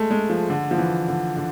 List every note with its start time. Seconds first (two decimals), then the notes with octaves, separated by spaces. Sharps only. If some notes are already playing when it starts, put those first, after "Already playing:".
Already playing: G#3 A3
0.11 G#3
0.30 F3
0.50 D3
0.71 F3
0.78 E3
1.08 D3
1.37 D3